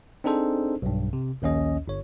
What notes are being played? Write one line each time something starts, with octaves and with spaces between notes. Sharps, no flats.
C4 D4 D#4 G#4 A4 C5
B1 G2
C3
A#1 D#2 C#4 D#5
G1 C#5